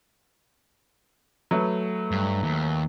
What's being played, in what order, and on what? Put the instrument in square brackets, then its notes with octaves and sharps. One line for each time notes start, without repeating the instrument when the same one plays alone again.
[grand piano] F#3 A3 B4
[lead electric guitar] G2
D#2